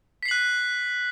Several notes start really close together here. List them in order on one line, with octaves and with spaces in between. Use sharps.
B6 C7 F#7 F#6